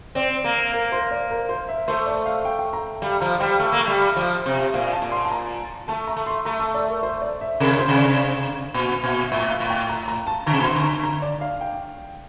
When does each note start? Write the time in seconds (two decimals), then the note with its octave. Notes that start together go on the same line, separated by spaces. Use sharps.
0.15 C4 D5
0.44 A#3
0.73 A#4
0.92 C5
1.11 D5
1.31 A#4
1.49 C5
1.68 E5
1.88 A3 C5
2.06 D5
2.26 F5
2.45 G5
2.59 G5
2.73 A#5
3.02 G3 F5
3.20 F3 A#5
3.40 G3 G5
3.59 A3
3.72 A#3
3.80 A3
3.87 G3
4.16 F3
4.46 C3
4.74 A#2 F5
4.93 A5
5.02 A#2
5.12 C6
5.25 A5
5.31 A#5
5.88 A3 A5
6.07 A#5
6.16 A3
6.26 C6
6.45 A3 A#5
6.59 A5
6.74 D5
6.89 A#4
7.03 C5
7.22 D5
7.41 E5
7.60 C3 A#4
7.79 C5
7.88 C3
7.98 D5
8.74 A#2
9.04 A#2
9.32 A2 E5
9.50 F5
9.60 A2
9.70 G5
9.89 A#5
10.08 A#5
10.27 A5
10.46 D3 A#5
10.53 C3
10.60 A#2
10.66 C3 C6
10.75 D3
10.84 A#5
11.04 A#5
11.22 D5
11.41 F5
11.61 G5